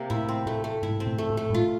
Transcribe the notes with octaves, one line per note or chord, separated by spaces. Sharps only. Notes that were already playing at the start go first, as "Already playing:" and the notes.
Already playing: C3 A#3
A2 E4
C4
A2 A3
A3
G#2 E4
C4
A2
A3
A2
A3
G#2
A2 F4